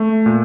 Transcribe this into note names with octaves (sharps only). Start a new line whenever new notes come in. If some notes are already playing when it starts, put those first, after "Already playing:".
Already playing: A3
A#2